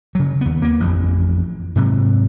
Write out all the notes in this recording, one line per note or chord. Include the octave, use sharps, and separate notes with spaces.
C#3 F#3
D#2 B3
A#3 B3
A1 F2
G#2 C3 F#3